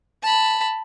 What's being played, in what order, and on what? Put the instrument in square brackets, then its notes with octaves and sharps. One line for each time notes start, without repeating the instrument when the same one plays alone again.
[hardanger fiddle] A5 B5